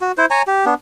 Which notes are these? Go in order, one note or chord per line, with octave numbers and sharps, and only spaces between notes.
F#4
E4 C5
C#5 G#5 A#5
G4
B3 D4